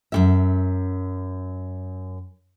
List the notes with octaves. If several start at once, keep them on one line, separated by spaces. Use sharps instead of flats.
F#2 B2 E5